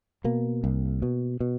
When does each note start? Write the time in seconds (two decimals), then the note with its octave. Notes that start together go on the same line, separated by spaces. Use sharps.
0.24 B2 A#3
0.64 C2
1.02 B2
1.40 B2